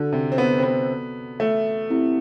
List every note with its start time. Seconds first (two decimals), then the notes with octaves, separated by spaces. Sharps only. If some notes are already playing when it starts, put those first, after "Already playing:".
Already playing: D3 F#4 A4 D5
0.12 C3
0.32 C4
0.38 B3
0.58 C4
0.63 B3
1.40 A3
1.90 C4 E4 G4